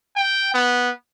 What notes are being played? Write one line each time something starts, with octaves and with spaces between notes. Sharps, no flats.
G5
B3